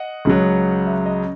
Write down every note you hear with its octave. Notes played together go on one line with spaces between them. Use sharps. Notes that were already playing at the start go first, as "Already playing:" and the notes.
Already playing: D#5 F#5
C#2 C#3 F#3
E5
D#5